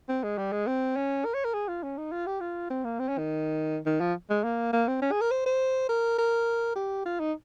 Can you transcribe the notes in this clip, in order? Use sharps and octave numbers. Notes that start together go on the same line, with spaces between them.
C4
G#3
G3
G#3
C4
C#4
A#4
C#5
A#4
G#4
F4
C#4
D#4
F4
G4
F4
C4
A#3
C4
C#4
D#3
D#3
F3
G#3
A#3
A#3
C4
C#4
G#4
A#4
C5
C5
A#4
A#4
G4
F4
D#4